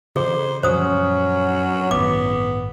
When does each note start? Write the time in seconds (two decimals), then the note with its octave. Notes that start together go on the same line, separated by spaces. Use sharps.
0.16 C#3 E3 G#4 C5
0.63 F#2 A#2 F3 F#3 C#4 C5 D#6
1.91 A1 G2 D#3 B3 D6